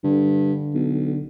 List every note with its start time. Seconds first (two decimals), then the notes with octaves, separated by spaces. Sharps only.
0.04 G2 D3
0.74 B1